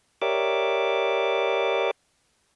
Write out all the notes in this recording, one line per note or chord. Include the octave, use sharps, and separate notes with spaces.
G4 A#4 C#5 D5 E5 D6